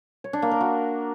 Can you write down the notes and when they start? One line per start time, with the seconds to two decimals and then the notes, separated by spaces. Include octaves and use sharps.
0.24 C#5
0.33 D4
0.42 A#3
0.51 A#4
0.61 F#4